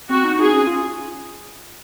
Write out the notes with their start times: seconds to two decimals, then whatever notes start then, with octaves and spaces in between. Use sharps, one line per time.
0.09 C4 F#4
0.24 D#4
0.39 D#4 G#4
0.53 C#4
0.67 F4